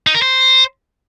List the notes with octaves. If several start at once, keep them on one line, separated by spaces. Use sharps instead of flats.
D#4
A#4
C5